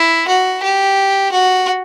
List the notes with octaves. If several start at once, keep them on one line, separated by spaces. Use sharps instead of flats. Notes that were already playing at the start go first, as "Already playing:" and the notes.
Already playing: E4
F#4
G4
F#4